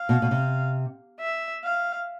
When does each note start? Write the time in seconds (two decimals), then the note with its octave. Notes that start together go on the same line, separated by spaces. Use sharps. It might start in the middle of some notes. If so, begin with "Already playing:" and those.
Already playing: F5
0.09 B2
0.22 B2
0.31 C3
1.20 E5
1.64 F5